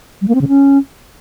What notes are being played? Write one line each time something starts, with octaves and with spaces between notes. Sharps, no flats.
G3
A#3
C4
C#3
C#4